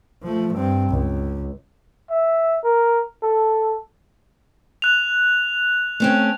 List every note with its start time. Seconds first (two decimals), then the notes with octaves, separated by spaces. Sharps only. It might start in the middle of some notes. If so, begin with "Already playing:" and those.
0.23 F3 A3
0.54 G2 C4
0.90 C#2
2.10 E5
2.64 A#4
3.23 A4
4.82 F#6 F7
6.00 A3 C4 C#4